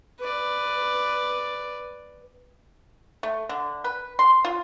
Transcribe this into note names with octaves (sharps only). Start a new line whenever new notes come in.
B4 D5
A3
D3
B4
C6
F4